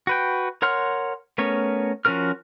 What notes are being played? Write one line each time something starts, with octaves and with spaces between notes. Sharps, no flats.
F#4 B4 G5
A#4 C#5 F#5 C6 F6
A3 B3 C#4 A#4 C#5
F3 C#4 F#4 A#4 F6